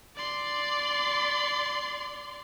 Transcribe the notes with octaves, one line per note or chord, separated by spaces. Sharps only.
D5 C6